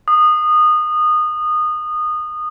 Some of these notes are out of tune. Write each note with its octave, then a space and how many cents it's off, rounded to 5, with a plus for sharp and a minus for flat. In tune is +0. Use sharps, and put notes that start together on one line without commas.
D#6 -20